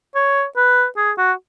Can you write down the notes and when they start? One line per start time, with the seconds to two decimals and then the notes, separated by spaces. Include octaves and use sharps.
0.15 C#5
0.57 B4
0.97 G#4
1.18 F#4